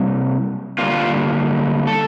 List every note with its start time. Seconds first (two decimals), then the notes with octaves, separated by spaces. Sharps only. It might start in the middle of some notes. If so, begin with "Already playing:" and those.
Already playing: C3 G3 A#3
0.78 D3 G3 A#3 F4
1.87 A4